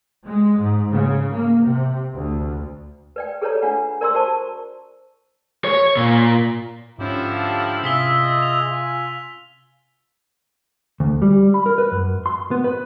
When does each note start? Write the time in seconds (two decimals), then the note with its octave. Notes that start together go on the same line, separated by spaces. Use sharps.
0.26 G#3
0.59 G#2
0.92 C#3
1.32 A#3
1.63 C3
2.15 D2
3.16 B4 D5 G5
3.42 G#4 A4 B4 C#5 D5 A#5
3.62 D4 F4 F#5
4.01 A#4 D5 A#5 C6 E6
4.15 F#4 C5 A5 C#6
5.64 C#5
5.97 A#2
6.98 G#2 D3 F3 C#4 E4 G4
7.33 G4 F5 A5
7.84 C3 F4 G#4 E5 E6 B6 G7
8.11 D#5
8.42 F7
8.71 F4 G#5
11.00 D2
11.22 G3
11.54 B5
11.66 A#4
11.78 B4
11.92 F#2
12.26 C6
12.51 B3
12.64 B4